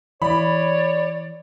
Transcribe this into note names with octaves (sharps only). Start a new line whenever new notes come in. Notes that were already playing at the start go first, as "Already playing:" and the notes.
E3 C#5 D5 B5